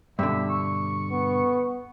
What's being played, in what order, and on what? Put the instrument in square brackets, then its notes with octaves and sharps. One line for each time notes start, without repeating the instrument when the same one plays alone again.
[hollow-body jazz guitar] G2 B2 D3 [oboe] E5
[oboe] C#6
[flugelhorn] B3